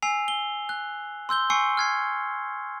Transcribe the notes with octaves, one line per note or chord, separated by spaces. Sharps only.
G#5 E6 C7 F7
G7
F#6
C6 E6 G6 G7
G#5 C#6 E6 C7 C#7
F6 G#6 C7